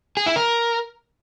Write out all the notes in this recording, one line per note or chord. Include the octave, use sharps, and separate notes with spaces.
G#4
E4
A#4